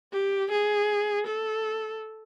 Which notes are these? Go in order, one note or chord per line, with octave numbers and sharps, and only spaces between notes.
G4
G#4
A4